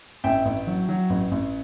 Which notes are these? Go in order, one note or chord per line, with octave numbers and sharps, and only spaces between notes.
A1 E5 G5
A1
F#3
F#3
A1
A1